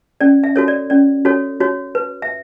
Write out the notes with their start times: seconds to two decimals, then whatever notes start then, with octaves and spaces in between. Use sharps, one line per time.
0.21 C#4 D5
0.44 E5
0.56 F#4 A4 C#5
0.68 D5
0.90 C#4 D5
1.25 F#4 A4 C#5
1.60 F#4 C#5
1.95 B4
2.22 E5